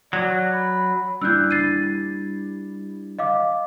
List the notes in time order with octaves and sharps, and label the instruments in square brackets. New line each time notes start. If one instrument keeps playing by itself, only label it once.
[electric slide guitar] F#3 [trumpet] D5
[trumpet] B5
[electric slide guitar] G3 D4 E4 [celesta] E6 F#6 G6
[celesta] A6 C7 D#7
D#5 F5 D6